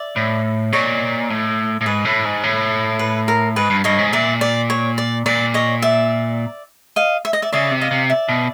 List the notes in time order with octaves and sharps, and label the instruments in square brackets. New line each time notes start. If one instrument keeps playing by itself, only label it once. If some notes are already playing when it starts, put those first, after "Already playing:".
Already playing: [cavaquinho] D5 E5
[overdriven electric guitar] A2
[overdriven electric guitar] A#2 [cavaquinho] C#5 D#5
[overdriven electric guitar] A2
A2
[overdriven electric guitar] G#2 [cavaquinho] B4
[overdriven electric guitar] A2
G#2
A2
[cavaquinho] B4
A#4
[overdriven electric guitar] G#2 [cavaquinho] B4
[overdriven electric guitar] G2
[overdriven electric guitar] G2 [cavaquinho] C#5 D#5
[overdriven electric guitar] G#2
[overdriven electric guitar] A#2 [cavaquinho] D5 E5
[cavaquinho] D5
C#5
D5
[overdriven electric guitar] A#2 [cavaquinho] D5
[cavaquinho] C#5 D#5
D5 E5
D#5 F5
E5
D#5
D5 E5
[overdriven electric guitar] C#3 [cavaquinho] D5 E5
[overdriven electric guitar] C3
[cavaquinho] D#5 F5
[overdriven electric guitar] C3
[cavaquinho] D5 E5
[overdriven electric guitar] B2